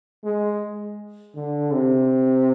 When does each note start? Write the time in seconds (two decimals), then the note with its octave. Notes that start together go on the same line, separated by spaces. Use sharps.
0.24 G#3
1.35 D3
1.73 C3